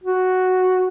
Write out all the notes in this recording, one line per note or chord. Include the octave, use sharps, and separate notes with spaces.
F#4